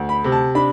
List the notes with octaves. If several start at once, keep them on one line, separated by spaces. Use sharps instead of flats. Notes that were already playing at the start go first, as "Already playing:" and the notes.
Already playing: D2
B5
C3
A5
D4 B5